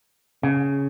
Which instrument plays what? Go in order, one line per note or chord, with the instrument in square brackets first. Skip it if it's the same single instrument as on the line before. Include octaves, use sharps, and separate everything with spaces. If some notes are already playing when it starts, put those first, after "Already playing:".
[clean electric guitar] C#3